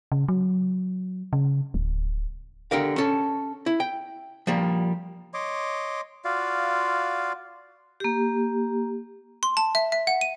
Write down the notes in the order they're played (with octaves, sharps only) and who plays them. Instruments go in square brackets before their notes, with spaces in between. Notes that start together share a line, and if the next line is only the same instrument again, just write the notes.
[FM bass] C#3
F#3
C#3
D1
[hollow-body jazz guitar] D3 G4 A#4 F5
C#4 A4
E4
G5
F3 G3 A#3
[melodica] C#5 D#5 C6 D6
F4 F#4 D5 F5
[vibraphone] A#3 G4
[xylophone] C6
A5
E5
E5
F#5
D#7